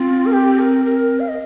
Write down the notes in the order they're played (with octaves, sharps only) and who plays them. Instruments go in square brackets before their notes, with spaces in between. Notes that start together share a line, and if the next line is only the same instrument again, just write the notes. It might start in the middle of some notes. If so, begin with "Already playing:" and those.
Already playing: [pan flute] C4 [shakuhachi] F4
[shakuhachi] A#4
G4
A#4
A#4
F5
D#5